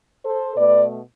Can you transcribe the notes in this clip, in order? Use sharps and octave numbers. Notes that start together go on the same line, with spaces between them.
A4 C5
B2 A3 B4 D5